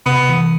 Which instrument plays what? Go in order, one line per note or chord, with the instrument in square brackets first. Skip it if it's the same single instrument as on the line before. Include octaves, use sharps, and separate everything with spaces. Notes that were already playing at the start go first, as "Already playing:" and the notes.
[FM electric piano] C3 [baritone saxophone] B3
[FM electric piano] E3